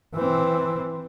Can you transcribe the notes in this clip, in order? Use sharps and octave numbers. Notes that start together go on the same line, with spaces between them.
E3 C4